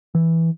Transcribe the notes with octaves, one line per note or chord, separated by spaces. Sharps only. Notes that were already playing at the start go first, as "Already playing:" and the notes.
E3